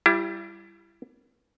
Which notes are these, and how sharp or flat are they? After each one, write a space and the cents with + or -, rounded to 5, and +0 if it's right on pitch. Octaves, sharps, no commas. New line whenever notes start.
G3 +0 E4 +30